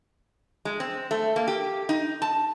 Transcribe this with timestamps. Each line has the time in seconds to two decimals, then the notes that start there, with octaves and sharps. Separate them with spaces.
0.65 G#3
0.80 C4
1.11 A3
1.36 A#3
1.48 G4
1.89 D#4
2.22 A5